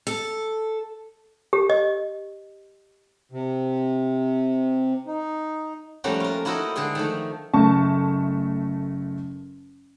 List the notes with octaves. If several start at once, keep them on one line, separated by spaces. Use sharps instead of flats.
A4
G4
D#5
C3
D#4
F3 G3 A3 A#3 C#4 F#4
F4 A#4
A#3 E4 F#4 A4 C5 D#5
D3 G#3 G#4 G5 C6
D#3 F3 A3
F#1 A3 A5 C#6